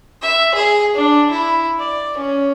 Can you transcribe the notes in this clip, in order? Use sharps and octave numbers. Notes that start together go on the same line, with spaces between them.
E5
G#4
D4
E4
D5
C#4